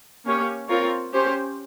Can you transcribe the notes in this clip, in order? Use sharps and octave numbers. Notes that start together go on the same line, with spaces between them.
A#3 C#4 G4 C#5
C4 F4 A#4 C#5
C#4 G4 C5